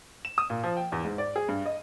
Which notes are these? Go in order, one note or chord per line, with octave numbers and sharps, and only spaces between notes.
E7
D#6
A#2
F3
G5
E2
G#2
D5
G#4
G2
D#5